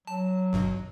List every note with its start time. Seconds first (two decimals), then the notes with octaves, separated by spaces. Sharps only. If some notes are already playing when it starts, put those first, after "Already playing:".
0.07 F#3 A5
0.53 G#1 G2 B2